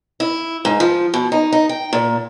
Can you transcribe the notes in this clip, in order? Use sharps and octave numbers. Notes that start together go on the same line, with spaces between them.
E4
G#2
F3
B2
D#4
D#4
G5
A#2